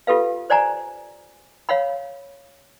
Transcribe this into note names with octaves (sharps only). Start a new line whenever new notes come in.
F4 G4 A4 B4 F5
C5 D5 F#5 G#5 A#5
C#5 F5 F#5 B5